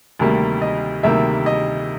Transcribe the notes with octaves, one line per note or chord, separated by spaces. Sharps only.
D2 C3 D#3 G3 A#3
D#5
D2 C3 D#3 G3 A#3 E5
D#5